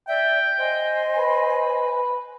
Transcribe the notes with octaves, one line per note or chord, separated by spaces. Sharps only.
D5 E5 G5
C5 D#5 G#5
B4